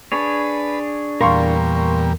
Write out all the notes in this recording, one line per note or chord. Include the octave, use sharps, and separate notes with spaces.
D4 G#4 B4 C#5
E2 A#2 G3 A#4 F5 C6 C#6